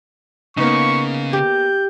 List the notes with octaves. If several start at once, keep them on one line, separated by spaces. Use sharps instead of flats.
C#3 A#3 B3 D#4 C#6
G4 G6